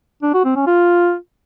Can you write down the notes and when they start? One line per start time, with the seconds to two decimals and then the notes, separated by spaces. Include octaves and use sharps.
0.23 D4
0.34 F#4
0.45 C4
0.56 C#4
0.67 F4